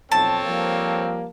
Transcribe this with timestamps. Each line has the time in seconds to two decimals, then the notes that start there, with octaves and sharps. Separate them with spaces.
0.12 B1 F2 C4 A4 C#5 A5
0.44 F3 G3 A#3